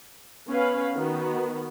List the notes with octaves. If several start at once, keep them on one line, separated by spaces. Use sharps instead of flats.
B3 C#4 B4 F5
D#3 B3 F#4